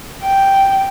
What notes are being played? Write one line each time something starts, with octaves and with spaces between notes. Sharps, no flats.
G5